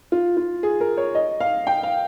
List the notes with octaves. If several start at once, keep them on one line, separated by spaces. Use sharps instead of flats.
F4
F4
G#4
A#4
C#5
D#5
F5
G5
F5